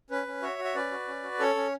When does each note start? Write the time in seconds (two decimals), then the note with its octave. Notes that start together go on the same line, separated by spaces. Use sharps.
0.10 C#4 B4
0.27 C#4
0.42 F#4 C#5 E5
0.59 F#4
0.64 E5
0.75 C#4 B4 D5
0.91 F#4
1.08 C#4
1.23 F#4
1.39 C#4 A4 C#5
1.55 C#4